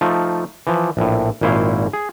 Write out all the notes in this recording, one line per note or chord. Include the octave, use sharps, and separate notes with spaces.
F3 A3 D#4 F4
E3 F3
A#1 A2
G#1 A#2 E4 C5 C#5 F5
G#4